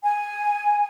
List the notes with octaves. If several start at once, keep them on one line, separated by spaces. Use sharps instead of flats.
G#5